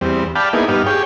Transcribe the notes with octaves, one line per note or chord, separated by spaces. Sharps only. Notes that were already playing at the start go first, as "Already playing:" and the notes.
E2 G3 C4
D5 F5 G5 A5 B5
A#3 B3 D#4 E4 G#4
G2 B3 D#4 G4 F5
G4 G#4 C#5 G5